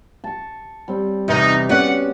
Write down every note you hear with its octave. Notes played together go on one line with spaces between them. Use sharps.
A5 C#6
G3 C4
E2 C3 D#4
B3 C#4 F#4 D5 F#5